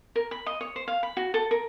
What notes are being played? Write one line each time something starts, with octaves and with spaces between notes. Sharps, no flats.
A#4
B5
D#5
C#5
C5
F5
B5
F#4
A4
A#4